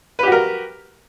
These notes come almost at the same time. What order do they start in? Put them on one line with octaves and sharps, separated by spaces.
B4 G4 F#4 A#4